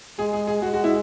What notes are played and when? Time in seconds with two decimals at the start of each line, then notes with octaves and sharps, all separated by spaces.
0.19 G#3 G#4
0.33 G#4
0.47 G#4
0.62 G#3 F#4
0.74 F#4
0.84 E4